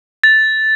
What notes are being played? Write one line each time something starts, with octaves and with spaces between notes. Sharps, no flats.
A6